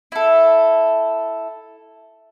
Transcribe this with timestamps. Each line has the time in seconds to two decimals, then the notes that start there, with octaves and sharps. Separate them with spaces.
0.12 E4 A4